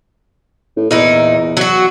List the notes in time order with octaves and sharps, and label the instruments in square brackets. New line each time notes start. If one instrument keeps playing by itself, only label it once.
[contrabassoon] A2
[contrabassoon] E2 [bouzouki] A#2 D#4 E4
[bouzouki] F#3 F#4